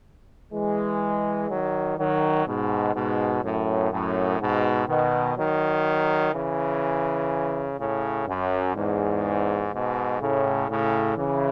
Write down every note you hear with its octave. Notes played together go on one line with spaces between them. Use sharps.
E3 G#3
D#3 F#3
D#3 F#3
G#2 B2
G#2 B2
F#2 A2
F#2 A2
G#2 B2
B2 D#3
D#3 F#3
C#3 E3
A2 C#3
F#2
E2 G#2
G#2 B2
A2 C#3
A2 C#3
C#3 E3